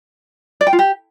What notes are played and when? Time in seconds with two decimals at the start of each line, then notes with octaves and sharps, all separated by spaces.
0.61 D5
0.67 G5
0.73 F4
0.79 G4